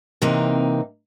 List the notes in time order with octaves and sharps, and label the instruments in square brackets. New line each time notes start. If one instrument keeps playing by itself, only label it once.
[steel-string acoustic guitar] C3 E3 A#3 C4 D#4